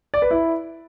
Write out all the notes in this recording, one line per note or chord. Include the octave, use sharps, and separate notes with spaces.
D5
B4
E4